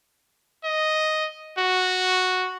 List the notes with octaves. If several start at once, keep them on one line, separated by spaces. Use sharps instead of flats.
D#5
F#4